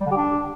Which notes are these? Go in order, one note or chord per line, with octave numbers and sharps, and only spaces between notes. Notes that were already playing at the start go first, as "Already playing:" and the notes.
G3
D3
G4
D4